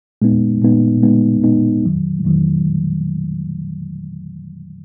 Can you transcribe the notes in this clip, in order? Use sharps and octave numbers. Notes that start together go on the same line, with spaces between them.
A#2 G#3 B3 D#4
A#2 G#3 B3 D#4
A#2 G#3 B3 D#4
A#2 G#3 B3 D#4
F2 D#3 F#3
F2 D#3 F#3